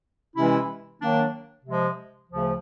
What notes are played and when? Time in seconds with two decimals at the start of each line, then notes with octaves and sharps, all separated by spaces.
0.36 C3 E3 G#3 C#4 E4
1.01 D#3 F#3 A#3 D4
1.65 C3 F3 G#3
2.30 D2 C#3 F3